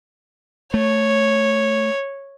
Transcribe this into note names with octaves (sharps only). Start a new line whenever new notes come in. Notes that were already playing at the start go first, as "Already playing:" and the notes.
A3 C#5